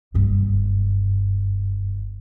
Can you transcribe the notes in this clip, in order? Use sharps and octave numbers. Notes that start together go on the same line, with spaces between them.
F#1 G2